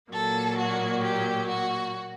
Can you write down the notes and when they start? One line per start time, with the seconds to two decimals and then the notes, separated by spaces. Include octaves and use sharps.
0.10 A#2 F#3 A#3 A4
0.56 F#4
1.02 G4
1.47 F#4